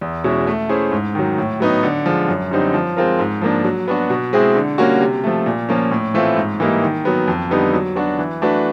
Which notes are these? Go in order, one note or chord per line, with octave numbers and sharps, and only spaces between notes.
E2
B2 G#3 C#4 E4
A3
C#4 E4 G#4 C5
G#2
D#3 F#3
A2
F#3 B3 D#4
D3
F3 G#3
F#2
D3 G3 C4 D#4
F3
G#3 C4 F4 A#4
G#2
F3 A#3 D4
F#3
B3 D4 F#4
B2
G#3 C4 E4 G#4
D3
G3 A#3 C#4 F#4
C3
F3 A3
A#2
F3 A#3 C#4
A2
E3 A3 C4 F4
G#2
E3 G3 A#3 D#4
D#3
F#3 B3
F2
D3 G3 B3 D#4
F#3
B3 D4 F#4
E3
A3 D4 F#4 B4